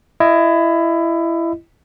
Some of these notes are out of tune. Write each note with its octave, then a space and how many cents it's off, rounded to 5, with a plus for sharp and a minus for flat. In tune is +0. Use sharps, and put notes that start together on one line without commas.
E4 +20 D#5 +0